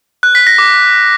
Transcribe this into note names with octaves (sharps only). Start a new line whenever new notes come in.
F#6
B6
A#6
D6